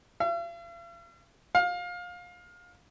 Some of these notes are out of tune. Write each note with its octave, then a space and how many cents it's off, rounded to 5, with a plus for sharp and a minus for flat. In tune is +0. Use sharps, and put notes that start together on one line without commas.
F5 -45
F5 +25